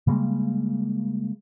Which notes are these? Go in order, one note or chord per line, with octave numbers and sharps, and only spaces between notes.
C#3 G3 G#3 A#3